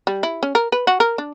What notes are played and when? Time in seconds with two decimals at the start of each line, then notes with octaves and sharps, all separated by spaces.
0.07 G3
0.23 E4
0.43 C#4
0.55 A#4
0.72 B4
0.87 F#4
1.00 A#4
1.18 D4